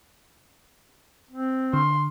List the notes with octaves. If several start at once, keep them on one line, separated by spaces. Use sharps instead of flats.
C4
D3 C6